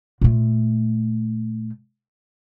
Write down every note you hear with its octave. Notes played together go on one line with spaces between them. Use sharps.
A#2 A3